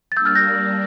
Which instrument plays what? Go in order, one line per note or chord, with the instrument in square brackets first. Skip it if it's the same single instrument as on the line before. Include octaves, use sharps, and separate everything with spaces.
[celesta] A6
[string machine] G3 A#3 D4 [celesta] E6 G6
[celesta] F6 A6
G6 A#6